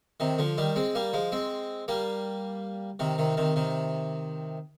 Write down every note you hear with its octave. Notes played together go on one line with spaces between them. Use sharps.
C3 D#3
D3 F3
D#3 G3
G#3 C4
G3 A#3
F3 G#3
G#3 C4
G3 A#3
C3 D#3
C3 D#3
C3 D#3
C3 D#3